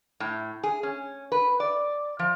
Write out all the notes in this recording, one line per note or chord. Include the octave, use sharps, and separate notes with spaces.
A2
G#4
C#4
B4
D5
F3